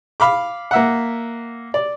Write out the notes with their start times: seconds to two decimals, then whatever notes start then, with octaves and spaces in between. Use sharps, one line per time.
0.20 F5 B5 D6
0.71 A#3 E5 F#5
1.74 D5